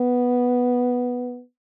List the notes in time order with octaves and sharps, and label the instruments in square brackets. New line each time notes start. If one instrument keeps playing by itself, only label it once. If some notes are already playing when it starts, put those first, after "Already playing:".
Already playing: [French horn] B3